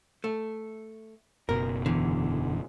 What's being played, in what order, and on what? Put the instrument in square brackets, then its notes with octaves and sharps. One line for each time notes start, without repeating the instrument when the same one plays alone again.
[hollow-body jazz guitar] A3
[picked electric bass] F#1 B2 [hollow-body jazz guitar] A#4
[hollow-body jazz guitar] E2 [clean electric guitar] D3 E3